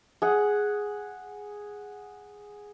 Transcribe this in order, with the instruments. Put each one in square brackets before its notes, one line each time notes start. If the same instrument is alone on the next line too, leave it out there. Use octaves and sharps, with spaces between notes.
[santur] G#4 F#5